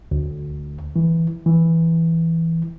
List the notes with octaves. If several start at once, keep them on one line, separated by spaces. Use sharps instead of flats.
D2
E3
E3